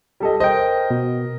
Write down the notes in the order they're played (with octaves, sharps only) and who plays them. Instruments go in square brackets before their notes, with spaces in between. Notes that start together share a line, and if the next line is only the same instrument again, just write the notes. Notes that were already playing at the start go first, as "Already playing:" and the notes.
[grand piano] G3 A4 D#5
[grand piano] A#4 D#5 [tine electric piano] C5 G5
[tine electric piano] B2